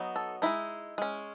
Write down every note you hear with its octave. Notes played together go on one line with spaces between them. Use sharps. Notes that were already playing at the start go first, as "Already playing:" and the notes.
Already playing: F#3 B3 D#4
A4
G#3 D#4 E4
G#3 C#4